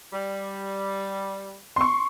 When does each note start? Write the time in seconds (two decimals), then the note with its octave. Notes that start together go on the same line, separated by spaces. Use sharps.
0.13 G3
1.76 C6 C#6